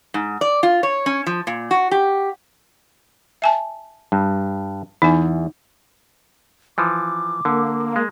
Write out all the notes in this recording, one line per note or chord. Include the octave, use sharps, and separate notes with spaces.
G#2
D5
F4
C#5
C#4
F3
A#2
F#4
G4
E5 G#5 A5
G2
E2 D#4 G#5
E3 F3 D6
D3 A#3
G#3